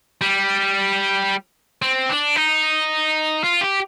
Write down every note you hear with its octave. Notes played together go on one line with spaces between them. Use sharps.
G3
C4
D4
D#4
F4
G4